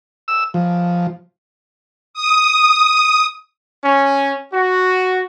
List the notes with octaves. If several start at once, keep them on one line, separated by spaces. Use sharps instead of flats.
E6
F3
D#6
C#4
F#4